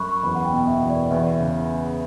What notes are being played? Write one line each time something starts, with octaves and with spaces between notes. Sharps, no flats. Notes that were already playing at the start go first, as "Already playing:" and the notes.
Already playing: F#2 B5 C#6 F#6
C#6
E2 B5
F#5
G5
B2
E5
E2
D5
E2 E5
C#3